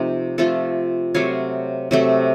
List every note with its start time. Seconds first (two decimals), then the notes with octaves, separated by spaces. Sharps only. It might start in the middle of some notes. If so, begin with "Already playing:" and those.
Already playing: C3 F3 A3 D#4
0.38 C3 F3 A3 F4 A4
1.15 C3 F#3 A3 C#5 F5
1.91 C3 F#3 A3